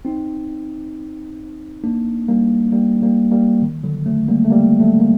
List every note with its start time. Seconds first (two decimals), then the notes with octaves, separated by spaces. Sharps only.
0.05 C4 D#4
1.84 A#3 D4
2.28 G3 A#3
2.72 G3 A#3
3.02 G3 A#3
3.32 G3 A#3
3.62 D#3
3.83 D3 F#3
4.06 F#3 A3
4.28 G3 A#3
4.45 A3
4.50 G3 A#3
4.80 F#3 A3
5.00 A#3